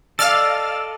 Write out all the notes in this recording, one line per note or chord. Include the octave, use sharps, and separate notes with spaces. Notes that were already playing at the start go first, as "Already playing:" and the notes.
A4 D5 D#5 F5 E6 F6 A6